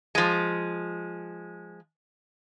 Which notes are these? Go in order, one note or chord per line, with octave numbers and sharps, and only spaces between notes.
F3 G#3